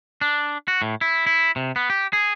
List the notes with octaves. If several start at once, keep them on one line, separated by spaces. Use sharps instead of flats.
D4
F#4
A2
E4
E4
C3
B3
G4
G#4